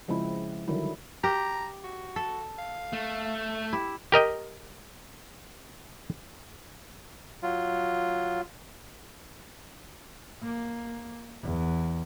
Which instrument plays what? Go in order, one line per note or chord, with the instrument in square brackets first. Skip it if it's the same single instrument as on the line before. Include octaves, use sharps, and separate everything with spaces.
[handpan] C#3 F3 G#3 C4 E4
D3 D#3 F#3 G3 E4
[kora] G4 [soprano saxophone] A#5
[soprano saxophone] F#4
[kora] A4
[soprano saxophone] F5
[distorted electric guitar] A3
[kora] E4 [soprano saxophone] G4
[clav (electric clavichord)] G4 A#4 D#5 G5
[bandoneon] F#3 F4
[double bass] A#3
E2